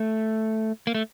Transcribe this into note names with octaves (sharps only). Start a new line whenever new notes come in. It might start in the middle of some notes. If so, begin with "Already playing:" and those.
Already playing: A3
A#3
A3